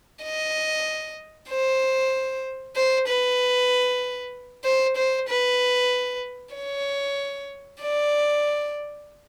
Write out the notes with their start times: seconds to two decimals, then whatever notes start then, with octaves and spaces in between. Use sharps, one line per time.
0.24 D#5
1.50 C5
2.76 C5
3.08 B4
4.64 C5
4.97 C5
5.29 B4
6.55 C#5
7.81 D5